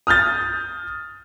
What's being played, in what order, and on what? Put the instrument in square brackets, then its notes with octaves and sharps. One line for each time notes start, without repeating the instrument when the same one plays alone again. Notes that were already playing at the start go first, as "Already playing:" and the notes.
[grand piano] D#6 F6 G6 A6